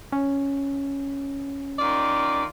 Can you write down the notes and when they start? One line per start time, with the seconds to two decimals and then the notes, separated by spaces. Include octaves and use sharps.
0.12 C#4
1.78 D#3 F4 D5